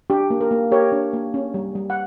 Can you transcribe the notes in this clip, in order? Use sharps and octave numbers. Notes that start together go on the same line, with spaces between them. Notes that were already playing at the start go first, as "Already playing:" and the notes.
D4 G4
A#3
A#4
A#3
G4 A#4 C#5
D4
A#3
C#4
G3
G3
F#5